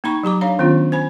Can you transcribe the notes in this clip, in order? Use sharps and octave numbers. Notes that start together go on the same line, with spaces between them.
A#3 D#4 A#5 B5 C#6
F#3 G4 A#5 D6
D4 C#5 F5 A#5
D#3 B3 C#4 D4 F4
C5 G#5 B5